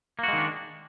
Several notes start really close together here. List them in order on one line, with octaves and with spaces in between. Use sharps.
A#3 F#4 G#3 D#3 D4